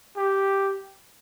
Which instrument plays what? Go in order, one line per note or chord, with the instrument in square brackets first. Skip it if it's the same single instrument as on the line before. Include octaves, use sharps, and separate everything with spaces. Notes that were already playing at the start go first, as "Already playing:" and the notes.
[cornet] G4